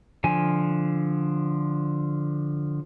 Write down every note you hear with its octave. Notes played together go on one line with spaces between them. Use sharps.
D3 F3 G#5